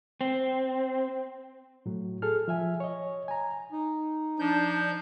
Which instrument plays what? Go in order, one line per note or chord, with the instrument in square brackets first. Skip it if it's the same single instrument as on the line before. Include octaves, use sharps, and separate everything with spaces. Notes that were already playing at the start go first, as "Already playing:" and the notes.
[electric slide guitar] C4
[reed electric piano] A2 F#3
G#4 A4 F6
F3 E5 G#5
C#5 D#5
G#5 A#5
[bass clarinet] D#4
[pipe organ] F3 G6 [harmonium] D4